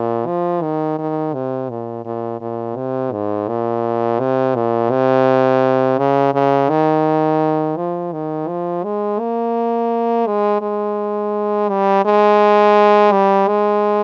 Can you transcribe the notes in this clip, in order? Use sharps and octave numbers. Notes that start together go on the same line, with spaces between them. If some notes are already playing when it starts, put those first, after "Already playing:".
Already playing: A#2
F3
D#3
D#3
C3
A#2
A#2
A#2
C3
G#2
A#2
C3
A#2
C3
C#3
C#3
D#3
F3
D#3
F3
G#3
A#3
G#3
G#3
G3
G#3
G3
G#3